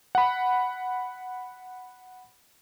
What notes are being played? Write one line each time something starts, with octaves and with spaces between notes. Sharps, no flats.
F#5 B5